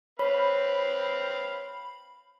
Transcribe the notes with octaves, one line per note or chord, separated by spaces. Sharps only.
C4 B4 C#5 F5 B5